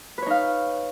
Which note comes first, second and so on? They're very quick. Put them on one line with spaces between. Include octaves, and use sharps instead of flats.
B4 C#5 D#4 F5